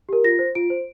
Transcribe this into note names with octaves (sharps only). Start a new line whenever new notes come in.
G4 A#4
F4 A#6
C5
F4 D7
C5